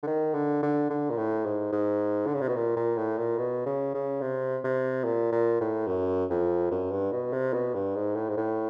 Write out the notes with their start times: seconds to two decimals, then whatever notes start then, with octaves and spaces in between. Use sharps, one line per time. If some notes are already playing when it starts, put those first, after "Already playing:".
0.03 D3
0.07 D#3
0.34 D3
0.63 D3
0.90 D3
1.10 A#2
1.17 A2
1.45 G#2
1.72 G#2
2.27 D3
2.34 C#3
2.41 C3
2.48 B2
2.56 A#2
2.76 A#2
2.97 A2
3.17 A#2
3.38 B2
3.66 C#3
3.94 C#3
4.21 C3
4.64 C3
5.05 A#2
5.32 A#2
5.61 A2
5.87 F#2
6.30 F2
6.71 F#2
6.91 G2
7.12 B2
7.33 C3
7.53 B2
7.74 G2
7.96 G#2
8.15 A2
8.29 G#2
8.37 A2